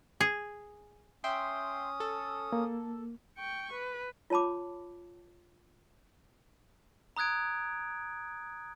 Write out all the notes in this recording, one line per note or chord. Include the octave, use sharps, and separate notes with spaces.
G#4
C#4 E5 G5 C6 D#6
A4
A#3
G5 C#6
B4
F4 C#5 A5 B5 D6
A#5 D#6 F#6 G#6 D7